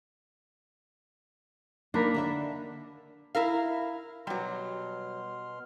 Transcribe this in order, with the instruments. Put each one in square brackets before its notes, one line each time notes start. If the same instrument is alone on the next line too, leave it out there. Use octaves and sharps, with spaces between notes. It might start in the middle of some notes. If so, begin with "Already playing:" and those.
[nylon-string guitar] A#3 D#4 [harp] D4 A#4 B5
[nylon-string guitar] D3 D5 E5
[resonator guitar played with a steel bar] E4 A#4 F5
[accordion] B2 C6 F6 [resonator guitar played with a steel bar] F#3 G3